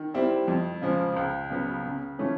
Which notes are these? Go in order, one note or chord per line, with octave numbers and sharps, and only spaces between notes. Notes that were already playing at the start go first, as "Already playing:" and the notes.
Already playing: D#3
G3 C4 E4
F2
C#3 F3 G#3
C#2
C#3 F#3 B3
C#3
E3 A3 C#4